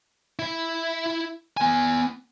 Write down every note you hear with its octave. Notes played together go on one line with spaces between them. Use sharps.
E4 E5
B3 G#5